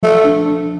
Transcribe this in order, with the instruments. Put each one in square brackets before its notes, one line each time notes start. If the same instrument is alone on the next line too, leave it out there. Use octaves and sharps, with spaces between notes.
[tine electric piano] F3 [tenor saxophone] A3
[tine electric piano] D4
D4